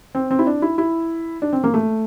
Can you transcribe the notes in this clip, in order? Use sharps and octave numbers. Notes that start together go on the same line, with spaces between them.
C4
C4
E4
D4
E4
E4
D4
C4
A#3
A3